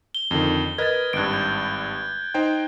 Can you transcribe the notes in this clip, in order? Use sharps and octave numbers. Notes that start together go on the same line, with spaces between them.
G7
F2 D3 D#3
A#4 B4 D#5 G#6 A6
G#1 G2 F#6 D7
G6
D#4 C5 G5